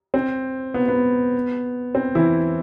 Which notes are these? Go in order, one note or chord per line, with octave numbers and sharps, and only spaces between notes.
C4
B3
B3
C4
E3 E4